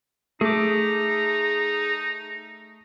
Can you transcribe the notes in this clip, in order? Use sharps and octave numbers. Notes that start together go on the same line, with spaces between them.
A3 D#4 G#4 D6